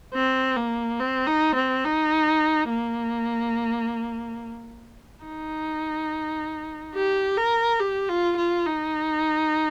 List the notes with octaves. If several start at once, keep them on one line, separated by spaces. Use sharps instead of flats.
C4
A#3
C4
D#4
C4
D#4
A#3
D#4
G4
A#4
G4
F4
F4
D#4